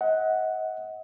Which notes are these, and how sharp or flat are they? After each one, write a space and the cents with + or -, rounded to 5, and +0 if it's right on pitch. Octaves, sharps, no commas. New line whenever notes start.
D#5 +35 F#5 +0